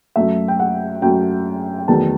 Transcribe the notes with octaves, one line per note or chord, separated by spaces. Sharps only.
F#2 F#3 A3 E5
G5
F#5
F#2 F#3 A3 G5
G5
E2 D#3 F#3 A3 A5